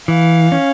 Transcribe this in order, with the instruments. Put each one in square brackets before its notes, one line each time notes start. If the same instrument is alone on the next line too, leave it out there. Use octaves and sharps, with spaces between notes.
[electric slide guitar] E3 [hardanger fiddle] F5
[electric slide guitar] C#4